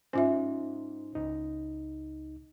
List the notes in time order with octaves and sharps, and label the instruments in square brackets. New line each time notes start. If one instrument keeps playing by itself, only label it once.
[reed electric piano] G#2 D#4 C5 [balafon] C#4 F4 E5
[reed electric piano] C#2 D#4